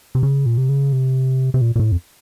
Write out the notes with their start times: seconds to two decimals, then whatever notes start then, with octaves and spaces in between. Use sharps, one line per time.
0.15 C3
0.23 C#3
0.46 A#2
0.58 C3
0.69 C#3
0.93 C3
1.54 C3
1.61 A#2
1.76 A#2
1.79 A2
1.92 F2